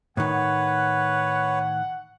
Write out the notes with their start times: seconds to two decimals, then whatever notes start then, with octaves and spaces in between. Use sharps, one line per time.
0.17 A2 D#3 B4 C#5 F#5